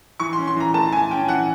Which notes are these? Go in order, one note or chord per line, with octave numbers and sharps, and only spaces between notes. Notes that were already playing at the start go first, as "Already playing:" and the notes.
E3 C#6
C6
C#4
C6
E3 A#5
A3 A5
E3 G#5
C#4 G5
E3 F#5